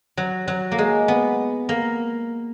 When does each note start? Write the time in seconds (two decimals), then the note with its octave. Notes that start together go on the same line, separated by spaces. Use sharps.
0.17 F#3
0.48 F#3
0.72 A#3
0.78 G#3
1.08 B3
1.69 A#3